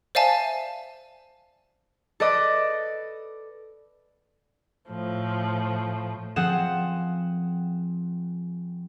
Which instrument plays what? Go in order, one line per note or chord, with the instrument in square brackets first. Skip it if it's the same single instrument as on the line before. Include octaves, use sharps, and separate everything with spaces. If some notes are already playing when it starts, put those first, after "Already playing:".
[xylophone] C5 D5 E5 F5 G#5 A5
[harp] A4 B4 D5 D#5 D6
[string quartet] A2 F3
[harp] F3 C4 G#4 F#5 E7